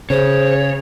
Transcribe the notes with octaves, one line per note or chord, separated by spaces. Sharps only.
C#3 G#4 C5 C#5